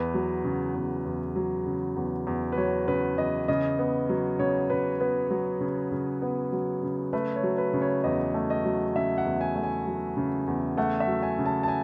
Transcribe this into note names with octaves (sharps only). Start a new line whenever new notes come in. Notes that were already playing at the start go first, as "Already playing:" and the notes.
Already playing: E2 B4
F#3
C#3
E2
E2
F#3
C#3
E2
E2
B4
F#3 C#5
C#3 B4
E2 D#5
C#3 D#5
B3
F#3
C#3 C#5
C#3 B4
B3 B4
F#3
C#3
C#3
B3
F#3
C#3
A3 B4
C#5
F#3
B4
C#3
C#5
E2 D#5
A3
D#5
F#3
C#3 E5
F#5
E2
G#5
A3
G#5
F#3
C#3
E2
A3 F#5
E5
F#3
G#5
C#3
A5
A5
G#5